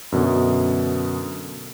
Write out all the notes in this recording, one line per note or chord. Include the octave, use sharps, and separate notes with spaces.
F#2 B2 D3